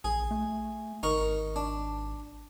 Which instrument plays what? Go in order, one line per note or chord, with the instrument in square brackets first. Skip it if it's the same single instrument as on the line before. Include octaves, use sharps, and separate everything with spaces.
[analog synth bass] A#1 [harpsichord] G#4
[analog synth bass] A3
[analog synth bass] G#1 [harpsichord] D#4 A#4 C#6
[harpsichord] D4